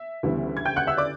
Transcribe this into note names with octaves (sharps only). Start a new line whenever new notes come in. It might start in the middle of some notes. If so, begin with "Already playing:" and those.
Already playing: E5
D2 C#3 E3 G3 B3
G#6
G5 G6
F#5 F#6
E5 E6
D5 D6